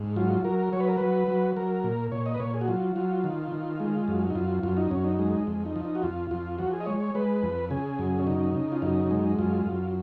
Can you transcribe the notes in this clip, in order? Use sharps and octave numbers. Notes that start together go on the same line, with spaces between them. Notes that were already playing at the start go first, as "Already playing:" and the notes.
Already playing: G#2
F#3 F4
F#3 A#4
F#3 C#5
B4
A#4
F#3 B4
F#3
F#3 A#4
A#2
A#2 C#5
D#5
B4
A#2 C#5
G#4
F#4
F#3 F4
F#3 F4
D#3
D#3
G#3
F#2
D#4
F#2 F4
F#2 F4
D#4
F#2 C#4
D#4
G#3
F2
D#4
F3
D#4
F#4
F2 F4
F2 F4
F3 F#4
G#4
D#5
G#3 C#5
C#5
G#3 B4
F2
C#3 G#4
F#2
C#4
C#3 D#4
C#3
F4
F#2 D#4
G#3
F#2 F4
F#2